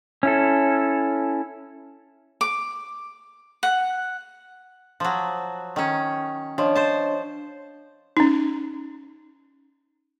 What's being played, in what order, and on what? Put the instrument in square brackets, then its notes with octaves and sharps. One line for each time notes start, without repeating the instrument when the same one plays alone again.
[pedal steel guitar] C#4 E4 A4
[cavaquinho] D6
F#5
[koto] F3 F#3
D#3 C#4
[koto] F3 [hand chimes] D4 C#5 D#5
[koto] C5 A5
[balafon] C#4 D#4